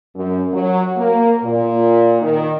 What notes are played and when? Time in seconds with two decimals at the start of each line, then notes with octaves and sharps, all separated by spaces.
0.15 F#2
0.52 F#3
0.97 A#3
1.43 A#2
2.21 D#3